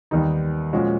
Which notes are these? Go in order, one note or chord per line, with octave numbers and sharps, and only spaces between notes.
D#2 D#3 G3 B3 D#4
A#2 F3 G#3 C#4 F#4